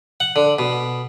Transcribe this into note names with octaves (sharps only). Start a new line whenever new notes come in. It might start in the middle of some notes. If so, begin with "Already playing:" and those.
F#5
D3
B2